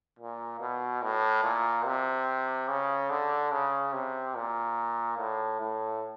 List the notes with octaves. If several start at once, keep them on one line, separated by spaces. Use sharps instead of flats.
A#2
B2
A2
A#2
C3
C#3
D3
C#3
C3
A#2
A2
A2